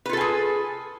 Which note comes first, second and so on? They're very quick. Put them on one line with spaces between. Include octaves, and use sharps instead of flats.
B4 F4 A4 G#5 G#4